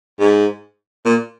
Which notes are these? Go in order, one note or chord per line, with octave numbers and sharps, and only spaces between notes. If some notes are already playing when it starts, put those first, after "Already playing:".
G#2
A#2